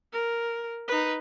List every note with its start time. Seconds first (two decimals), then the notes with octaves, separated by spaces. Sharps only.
0.13 A#4
0.88 D#4 B4